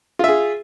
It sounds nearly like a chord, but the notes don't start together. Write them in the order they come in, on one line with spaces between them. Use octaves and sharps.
F4 E5 G#4